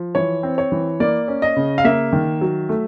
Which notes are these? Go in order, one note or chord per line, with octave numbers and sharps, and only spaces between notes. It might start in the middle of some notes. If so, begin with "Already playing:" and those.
Already playing: F3
E3 C#5
C4
C#5
E3
A#3 D5
C#4
D#5
C#3
F5
A#3 E5
D#3
F#3
A3